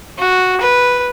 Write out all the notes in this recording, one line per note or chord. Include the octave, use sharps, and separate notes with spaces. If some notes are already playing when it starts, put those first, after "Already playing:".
F#4
B4